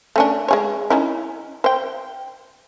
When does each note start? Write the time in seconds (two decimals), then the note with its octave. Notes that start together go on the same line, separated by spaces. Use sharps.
0.16 A3 C#4 D4
0.48 G#3 G#4 C#5
0.90 C#4 D#4 E4
1.64 C5 G5